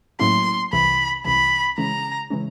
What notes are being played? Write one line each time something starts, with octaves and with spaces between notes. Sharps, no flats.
A2 F#3 A#3 C#4 E4 C6
C2 C3 E3 B5
C2 C3 E3 B5
C#3 E3 G#3 C#4 A#5
C#3 E3 G#3 C#4